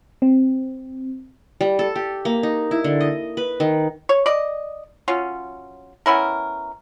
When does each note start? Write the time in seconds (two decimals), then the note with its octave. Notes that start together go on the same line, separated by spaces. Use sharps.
0.22 C4
1.61 G3
1.79 A4
1.96 G4
2.25 A#3
2.43 D#4
2.71 E4
2.84 D3
3.00 D#5
3.37 B4
3.60 D#3
4.09 C#5
4.26 D5 D#5
5.08 F#3 C#4 F4
6.06 B3 C#4 E4 A#4